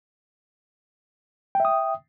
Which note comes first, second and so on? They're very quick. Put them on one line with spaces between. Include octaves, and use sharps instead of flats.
G5 E5 D#6